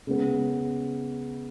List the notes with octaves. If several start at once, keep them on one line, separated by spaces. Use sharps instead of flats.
C#3 G#3 B3